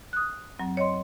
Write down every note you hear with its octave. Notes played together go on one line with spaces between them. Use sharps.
D#6 F#6
F#2 F#3 C4
C#5 D#5 C6